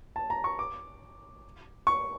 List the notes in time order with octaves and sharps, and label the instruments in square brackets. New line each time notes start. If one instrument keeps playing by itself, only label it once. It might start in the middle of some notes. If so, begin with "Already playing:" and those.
[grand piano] A5
A#5
C#6
D6
C#6